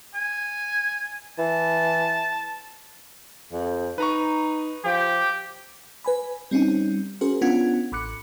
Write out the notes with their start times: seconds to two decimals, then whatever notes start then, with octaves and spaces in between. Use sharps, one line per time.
0.15 G#5
1.39 E3 A5
3.52 F2
3.98 D#4 B4 A#5 C#6
4.85 F3 G4
6.05 B4 G#5 B5
6.51 G3 C4 C#4 D#4
7.21 C#4 F#4 G#4 A#4 C5
7.41 B3 C#4 D4 F4 F#5 G#6
7.92 A1 B5 D6 F#6 C#7